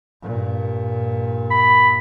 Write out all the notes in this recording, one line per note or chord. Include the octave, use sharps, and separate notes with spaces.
G2 A#2
B5